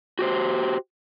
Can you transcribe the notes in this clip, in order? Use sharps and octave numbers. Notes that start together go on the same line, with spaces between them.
F#4 G4 C5